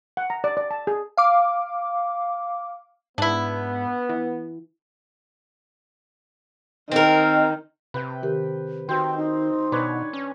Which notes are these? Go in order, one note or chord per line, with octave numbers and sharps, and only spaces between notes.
F#5
A#5
D5
D5
A5
G#4
F5 D6
G#2 B3 D4 E4
E3
D#3 C4 A#4
C3 B4 G5
D#3 G4 A#4
D#3 C4 F#4 C5 G5
D#4
B2 D4 B4 C#5
C#4